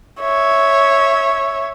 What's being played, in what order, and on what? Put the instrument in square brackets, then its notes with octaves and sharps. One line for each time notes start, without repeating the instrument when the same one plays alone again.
[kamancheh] C#5 E5